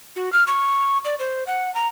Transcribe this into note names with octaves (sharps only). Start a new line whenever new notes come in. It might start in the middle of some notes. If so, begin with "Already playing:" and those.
F#4
F6
C#6
D5
C5
F#5
A#5